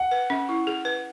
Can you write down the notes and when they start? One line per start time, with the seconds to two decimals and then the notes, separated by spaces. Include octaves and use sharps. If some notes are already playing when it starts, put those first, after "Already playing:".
Already playing: F#5
0.11 B4
0.30 C#4
0.49 E4
0.67 G#4
0.85 B4